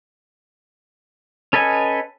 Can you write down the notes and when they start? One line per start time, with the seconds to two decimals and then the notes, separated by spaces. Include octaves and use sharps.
1.53 C#4 A4 B4 D#5 G#5